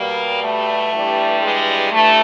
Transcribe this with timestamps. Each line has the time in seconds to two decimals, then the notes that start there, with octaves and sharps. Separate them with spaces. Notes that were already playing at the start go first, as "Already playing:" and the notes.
Already playing: B2 G3 A#3
0.42 A3
0.92 G2 E3 G3
1.42 G#3
1.92 G2 E3 G3 A3